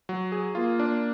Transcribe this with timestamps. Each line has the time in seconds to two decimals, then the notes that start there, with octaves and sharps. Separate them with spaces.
0.09 F#3
0.32 G#4
0.55 A#3 F4
0.79 D4